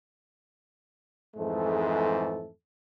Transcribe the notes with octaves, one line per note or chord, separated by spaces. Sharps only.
F2 G#2 E3 G#3 A3 A4